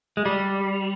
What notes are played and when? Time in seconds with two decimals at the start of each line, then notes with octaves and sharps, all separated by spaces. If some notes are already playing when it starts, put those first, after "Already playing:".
0.17 G#3
0.25 G3